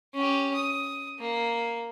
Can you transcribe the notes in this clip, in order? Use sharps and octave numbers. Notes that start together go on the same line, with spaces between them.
C#4 G4
D#6
A#3